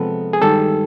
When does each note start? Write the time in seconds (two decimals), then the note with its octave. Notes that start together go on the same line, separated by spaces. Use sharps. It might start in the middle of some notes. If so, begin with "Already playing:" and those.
Already playing: C3 F3 G#3 B3 A4 B4
0.33 G#4
0.42 G2 D#3 G#3 G4 A4